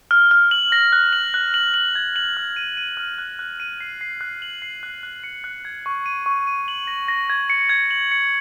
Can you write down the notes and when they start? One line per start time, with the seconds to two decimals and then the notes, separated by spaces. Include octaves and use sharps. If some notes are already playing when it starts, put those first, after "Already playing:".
0.11 F6
0.31 F6
0.51 F#7
0.72 A#6
0.92 F#6
1.13 F#7
1.34 F#6
1.54 F#7
1.74 F#7
1.95 G#6
2.16 F#7
2.37 F6
2.56 D#7
2.77 D#7
2.97 F6
3.18 F#6
3.39 F#6
3.60 D#7
3.80 C7
4.01 C7
4.21 F#6
4.42 F#7
4.62 C7
4.83 F#6
5.03 F#6
5.24 C#7
5.44 F#6
5.65 G#6
5.86 C#6
6.06 D#7
6.26 C#6
6.47 D#7
6.68 F#7
6.87 A#6
7.08 A#6
7.30 G#6
7.50 C#7
7.69 G#6
7.91 F#7
8.11 C#7